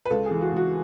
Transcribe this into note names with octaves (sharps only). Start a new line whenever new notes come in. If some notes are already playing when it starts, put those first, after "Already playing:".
B4
C#2 A4
G#4
E3
F#4
C#2 F#4